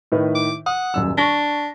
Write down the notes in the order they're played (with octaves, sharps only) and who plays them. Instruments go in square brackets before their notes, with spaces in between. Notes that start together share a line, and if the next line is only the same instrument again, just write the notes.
[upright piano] A2 D#3 B4
[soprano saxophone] D6
[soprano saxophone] F#5 [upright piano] D#6
[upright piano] D#1 F#2 E6
[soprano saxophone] D4 [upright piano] C#6 A#6